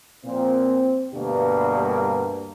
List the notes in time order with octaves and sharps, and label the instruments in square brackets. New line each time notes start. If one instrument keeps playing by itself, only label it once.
[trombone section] A#2 F3 [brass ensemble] C4
[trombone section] D2 B2 A#3 [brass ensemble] G2